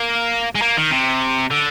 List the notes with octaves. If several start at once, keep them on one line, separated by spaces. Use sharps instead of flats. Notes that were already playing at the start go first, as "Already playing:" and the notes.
Already playing: A#3
G#3
A#3
D#3
C3
D3